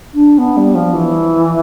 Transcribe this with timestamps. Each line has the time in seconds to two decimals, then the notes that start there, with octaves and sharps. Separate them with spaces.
0.14 D4
0.38 B3
0.57 G3
0.74 F3
0.93 E3